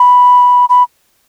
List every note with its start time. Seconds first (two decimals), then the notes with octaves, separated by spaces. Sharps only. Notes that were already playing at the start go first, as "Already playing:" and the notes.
Already playing: B5
0.69 B5